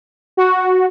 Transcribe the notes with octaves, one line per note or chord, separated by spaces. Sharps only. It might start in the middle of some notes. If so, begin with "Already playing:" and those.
F#4